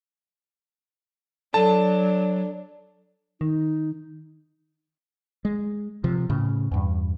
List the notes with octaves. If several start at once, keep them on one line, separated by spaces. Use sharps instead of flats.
F#3 D4 A4 A5
D#3 D#4
G#3
C3 F3
A2 C#3
E2 G2